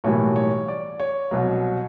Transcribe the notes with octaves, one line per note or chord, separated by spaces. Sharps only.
B1 A2 E3 G3 A#3 C#5
C#5
D5
C#5
C2 B2 F#3